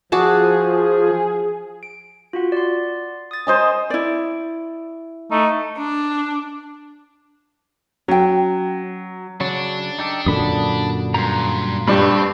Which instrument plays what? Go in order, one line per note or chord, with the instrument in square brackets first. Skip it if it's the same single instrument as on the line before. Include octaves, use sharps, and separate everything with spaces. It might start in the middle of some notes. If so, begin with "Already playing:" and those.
[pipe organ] F3 [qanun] F#4 D5 A5 [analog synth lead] G#4
[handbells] D7
F4 F#4 F#5
D5 F#5 C6
D#6 A6
[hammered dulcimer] C5 D#5 G#5
[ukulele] E4 D5
[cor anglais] A3 [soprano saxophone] D#4
[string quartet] D4
[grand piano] F#3 [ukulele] C#4 G5
[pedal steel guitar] C#3 F#3 [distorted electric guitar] D4
[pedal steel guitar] D#4 G4 A4
[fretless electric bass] F#2 A#2 D3 [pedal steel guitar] A5 B5 D#6
[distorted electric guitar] G2 [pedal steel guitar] A#5 C6
[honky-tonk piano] G2 D4 G4 [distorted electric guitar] C4 [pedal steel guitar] A4 B4 B5